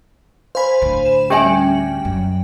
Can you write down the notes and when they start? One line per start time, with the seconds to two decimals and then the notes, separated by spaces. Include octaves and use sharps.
0.55 C5 F5 G#5 B5
0.82 D2 A2
1.05 E7
1.30 G3 C#4 F#4 G4 E5 G5 G#5
2.05 F#2